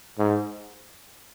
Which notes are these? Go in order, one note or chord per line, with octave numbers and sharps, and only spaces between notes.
G#2